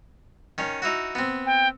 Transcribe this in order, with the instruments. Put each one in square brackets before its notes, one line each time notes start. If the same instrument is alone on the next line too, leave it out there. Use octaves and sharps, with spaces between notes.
[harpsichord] D#3 C#4
D#4 E4 F#4
B3 C4
[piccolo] G5